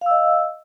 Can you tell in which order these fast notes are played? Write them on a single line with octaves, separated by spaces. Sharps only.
F5 E6 D#5